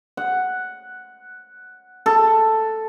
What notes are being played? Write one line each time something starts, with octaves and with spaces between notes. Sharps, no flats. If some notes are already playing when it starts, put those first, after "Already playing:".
F#5
A4